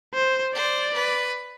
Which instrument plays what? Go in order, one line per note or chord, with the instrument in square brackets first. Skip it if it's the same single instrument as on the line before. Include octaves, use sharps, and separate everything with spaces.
[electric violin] C5
[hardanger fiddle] C5 [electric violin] D5
[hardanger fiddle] B4